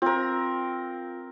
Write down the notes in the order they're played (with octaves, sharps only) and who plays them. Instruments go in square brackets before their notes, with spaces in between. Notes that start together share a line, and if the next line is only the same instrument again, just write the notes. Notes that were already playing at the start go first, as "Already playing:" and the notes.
[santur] C4 A#4 [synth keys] F4